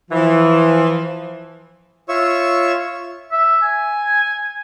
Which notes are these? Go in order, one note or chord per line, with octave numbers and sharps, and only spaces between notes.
E3 F3
F4 C#5 E5 C#6 E6
E5
G#5